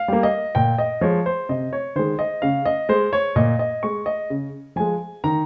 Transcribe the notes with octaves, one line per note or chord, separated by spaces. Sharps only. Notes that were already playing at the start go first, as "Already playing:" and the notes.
Already playing: F5
G3 A#3
D#5
A#2 G5
D#5
F3 G#3 C#5
C5
C3 D#5
C#5
D#3 G#3 C5
D#5
C#3 F5
D#5
G#3 C5
C#5
A#2 D#5
D#5
G#3 C#6
D#5
C#3
F3 G#3 G#5
D#3 A#5